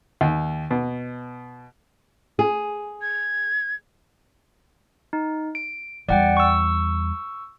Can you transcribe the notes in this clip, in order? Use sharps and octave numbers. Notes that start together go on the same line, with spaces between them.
D#2
B2
G#4
G#6
D#4
D7
E2 G3 D5 F#5 G5
C#6 E6